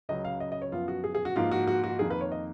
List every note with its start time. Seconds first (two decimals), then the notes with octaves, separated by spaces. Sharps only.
0.09 C#2 C#3 F#3 D#5
0.25 F5
0.40 D#5
0.52 D#5
0.62 C#5
0.72 F#2 F3 B3 F4
0.88 F#4
1.04 G#4
1.15 G#4
1.25 F#4
1.36 G#2 F3 A#3 F4
1.51 F#4
1.67 F#4
1.84 F#4
1.99 F2 D#3 A#3 G#4
2.10 B4
2.21 C#5
2.32 D#5